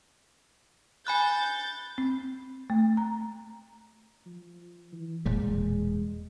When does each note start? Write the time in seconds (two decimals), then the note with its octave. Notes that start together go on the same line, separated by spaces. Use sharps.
1.07 G#5 B5 F#6 G6 A6
1.98 C4
2.70 A3
2.97 A#5
4.26 F3
4.92 E3
5.26 E1 A#2 G3 G#3